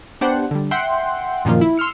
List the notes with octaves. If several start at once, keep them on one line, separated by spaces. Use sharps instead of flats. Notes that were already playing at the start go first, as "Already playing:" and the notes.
B3 D4 G4 C5 F#5
D3 G3
E5 F#5 G5 C6
F#2 A#2 D#3 F3 A#3 F4
E4
C6 E6 F6 C#7